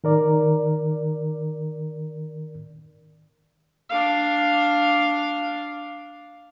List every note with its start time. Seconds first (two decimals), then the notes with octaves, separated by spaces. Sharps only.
0.04 D#3 A#4 D5
3.89 D4 F5